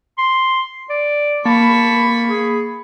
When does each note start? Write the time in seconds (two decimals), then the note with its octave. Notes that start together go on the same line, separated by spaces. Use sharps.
0.18 C6
0.90 D5
1.45 A#3 A5 B5 C#6
2.29 G#4